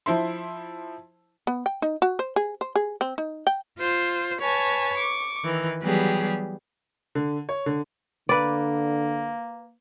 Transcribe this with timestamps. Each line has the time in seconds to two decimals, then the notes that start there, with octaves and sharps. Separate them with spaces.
0.06 F3 E4 C5 E5 C6
1.47 B3
1.66 G5
1.82 D#4
2.02 F#4
2.19 C5
2.36 G#4
2.61 C5
2.75 G#4
3.01 C4
3.18 D#4
3.47 G5
3.79 F4 C5
4.41 B4 C#5 G#5 A5
4.97 C#6 D6
5.44 D#3 E3
5.81 E3 F#3 G3 B3 G4 G#4
7.15 D3
7.49 C#5
7.66 D3
8.29 D3 A#3 B4 D5